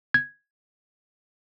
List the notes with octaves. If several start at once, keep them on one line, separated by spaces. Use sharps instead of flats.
G#6